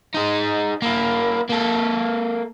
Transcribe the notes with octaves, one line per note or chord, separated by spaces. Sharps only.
D#4 G#4
A#3 E4
A#3 A4